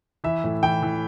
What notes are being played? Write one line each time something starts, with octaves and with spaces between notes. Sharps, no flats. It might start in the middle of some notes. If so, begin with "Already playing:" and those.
E3 E5
A2
E3 G5
E3